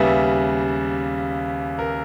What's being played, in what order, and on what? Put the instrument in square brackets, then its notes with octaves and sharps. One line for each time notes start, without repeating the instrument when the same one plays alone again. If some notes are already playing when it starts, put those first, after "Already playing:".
Already playing: [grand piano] D#2 C#3 G3 B3 E5
A#4